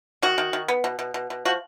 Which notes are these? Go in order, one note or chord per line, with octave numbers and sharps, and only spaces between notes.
D#3 F#4
D#3
D#3
B3
B2
B2
B2
B2
F3 F#4